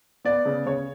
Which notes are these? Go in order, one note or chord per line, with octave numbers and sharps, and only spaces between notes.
B3 D5
C#3
C#3 C#5